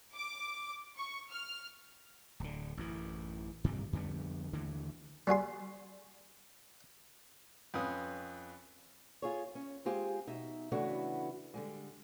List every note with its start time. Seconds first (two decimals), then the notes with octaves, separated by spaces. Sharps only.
0.13 D6
0.95 C#6
1.29 F6
2.40 D1 D3
2.77 A1 F#2 E3
3.64 G2 C3 D#3 G3
3.93 F2 D3 G3 B3
4.52 D#2 D3 E3 A3
5.27 G3 F#4 G#4 C6
7.74 F2 C#4 B4 D#6
9.22 F4 G#4 C#5
9.55 C#4
9.85 G#3 C4 F4 G4 G#4
10.27 B2 D#4 E5
10.72 C#3 E3 A3 B3 D4 F#4
11.54 D3 G3 G#3